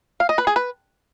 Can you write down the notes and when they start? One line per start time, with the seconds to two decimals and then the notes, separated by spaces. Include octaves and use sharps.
0.20 F5
0.29 D#5
0.38 B4
0.47 G#4
0.56 B4